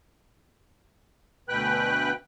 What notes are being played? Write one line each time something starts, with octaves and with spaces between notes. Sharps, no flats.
D2 B2 B4 G5 F#6